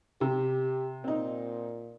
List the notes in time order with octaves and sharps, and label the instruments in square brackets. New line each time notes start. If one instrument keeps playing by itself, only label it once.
[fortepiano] C3 [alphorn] G4
[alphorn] A#2 [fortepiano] C4 D#4